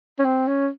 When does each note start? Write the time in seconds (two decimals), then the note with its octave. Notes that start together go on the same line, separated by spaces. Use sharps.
0.19 C#4
0.25 C4
0.47 C#4